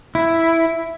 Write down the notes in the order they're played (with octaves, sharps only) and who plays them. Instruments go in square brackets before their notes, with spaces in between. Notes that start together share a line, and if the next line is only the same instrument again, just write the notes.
[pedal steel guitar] E4